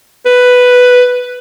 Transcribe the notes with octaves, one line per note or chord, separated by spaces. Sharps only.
B4